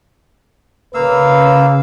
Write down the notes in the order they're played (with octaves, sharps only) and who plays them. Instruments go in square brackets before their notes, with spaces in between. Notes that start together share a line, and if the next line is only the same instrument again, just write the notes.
[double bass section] C#3 [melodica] A#3 F5 E6 [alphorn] B4